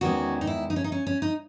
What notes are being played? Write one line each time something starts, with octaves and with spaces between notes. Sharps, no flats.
E2 D#3 G#3 C#4 F#4
D#4
E4
D#4
C#4
D#4
C#4
C#4
D#4